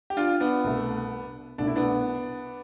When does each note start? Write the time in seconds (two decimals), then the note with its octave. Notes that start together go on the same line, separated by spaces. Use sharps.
0.10 G4
0.17 D4 F4
0.40 B3 D4
0.64 C2 B2 A3
1.58 C2 B2 A3 D4
1.67 E4
1.76 B3 D4